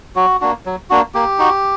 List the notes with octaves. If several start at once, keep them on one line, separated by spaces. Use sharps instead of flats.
F#3 F#4
A#3 D4 F#4
F#3
A#3 D4 F#4
A#3 G4
D#4 F#4